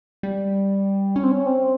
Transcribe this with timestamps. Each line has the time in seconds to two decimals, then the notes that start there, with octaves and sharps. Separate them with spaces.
0.23 G3
1.16 C#4
1.23 C4
1.31 C#4
1.46 C4